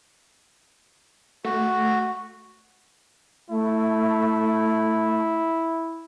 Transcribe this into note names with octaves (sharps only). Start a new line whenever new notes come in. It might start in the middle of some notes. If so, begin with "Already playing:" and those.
A3 F#4
A3 E4